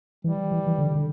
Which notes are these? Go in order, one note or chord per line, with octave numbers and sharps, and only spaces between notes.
E3 G3
E3
E3
D3
D3